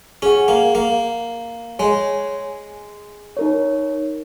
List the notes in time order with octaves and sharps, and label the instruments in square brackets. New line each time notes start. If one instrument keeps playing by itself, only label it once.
[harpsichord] C#4 [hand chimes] G#4 F#5
[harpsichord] A#3
A#3
[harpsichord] G#3 [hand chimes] G#4 C#5 G#5
[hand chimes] D#4 A#4 C#5